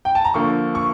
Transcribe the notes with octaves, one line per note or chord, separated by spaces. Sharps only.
G5
A5
A#5
D3 F3 A#3 C#6
C#6